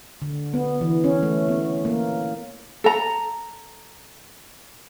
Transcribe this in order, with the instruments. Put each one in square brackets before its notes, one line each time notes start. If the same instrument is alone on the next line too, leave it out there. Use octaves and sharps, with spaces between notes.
[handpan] D3
B3
E3
C#4
A3
B3
A#3
[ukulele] A4 A#5